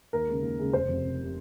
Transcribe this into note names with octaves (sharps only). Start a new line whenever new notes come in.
D#2 A#4
C#3 G#3
D#2
C#3 G#3
F1 C5
F2 C3
F1
C3